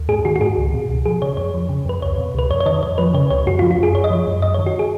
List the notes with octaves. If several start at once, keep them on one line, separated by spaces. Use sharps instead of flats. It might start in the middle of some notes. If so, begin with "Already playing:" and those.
Already playing: D#2
G#2 G#4
D#3 F#4
F#4
G#2 G#4
C#2
B2
C#2
F3 G#4
C#3 C#5
F2 C#5
F3
C#3
F2 B4
C#2 C#5
B2
C#2 B4
F2 C#5
C#5
D#3 D#5
F2 C#5
F3 B4
C#3 C#5
C#2 C#5
F#2 F#4
F4
F3
F4
F#2 G#4
F#2 C#5
D#5
F3 C#5
F#2
F#2 D#5
C#5
D#3
F#4
G#4